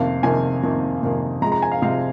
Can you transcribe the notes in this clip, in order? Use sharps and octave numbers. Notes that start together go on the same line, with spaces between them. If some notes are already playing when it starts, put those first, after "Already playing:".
Already playing: F2 C3 D#3 A#3 F5
F2 C3 D#3 A#3 G#5
F2 C3 D#3 A#3
F2 C3 D#3 A#3
C3 F3 G#3 A#5
A#5
G#5
F5
C3 F3 G#3 F5